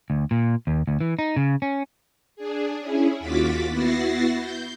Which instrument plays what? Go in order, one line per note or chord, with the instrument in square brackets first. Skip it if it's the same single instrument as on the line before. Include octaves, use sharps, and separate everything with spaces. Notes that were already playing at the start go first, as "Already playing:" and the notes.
[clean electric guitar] D2
A#2
D#2
D2
E3
D#4
C#3
C#4
[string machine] D4 G#4
C#4 E4 G#4
D#2 F4 F#4 D6 A6 B6
B3 E4 F#4 A6 A#6 C7
G6